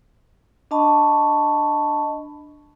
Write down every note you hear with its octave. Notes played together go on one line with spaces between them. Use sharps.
D4 D#5 A5 B5 C#6